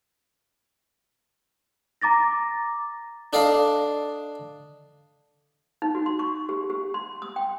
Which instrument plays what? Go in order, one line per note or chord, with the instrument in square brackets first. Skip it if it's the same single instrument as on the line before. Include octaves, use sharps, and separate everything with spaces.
[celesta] A#5 D6 A6 A#6
[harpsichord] D4 A4 D5 D#5 F5
[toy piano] D#4
F#4
C6
C#6
G4
G4
C6
D#6
G5